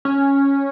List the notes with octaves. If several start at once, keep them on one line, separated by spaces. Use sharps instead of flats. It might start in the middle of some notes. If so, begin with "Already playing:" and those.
C#4